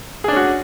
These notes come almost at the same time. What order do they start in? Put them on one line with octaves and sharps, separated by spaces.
G#4 D4 C#4 F#4